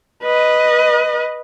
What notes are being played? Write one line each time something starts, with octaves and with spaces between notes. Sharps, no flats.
B4 D#5